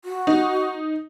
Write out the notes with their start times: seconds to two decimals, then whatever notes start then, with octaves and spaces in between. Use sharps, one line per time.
0.05 F#4
0.27 D#4